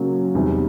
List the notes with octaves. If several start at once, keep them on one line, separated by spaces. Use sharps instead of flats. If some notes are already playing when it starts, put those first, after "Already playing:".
Already playing: C#3 F#3 A#3 C#4
E2 C3 D#3 G3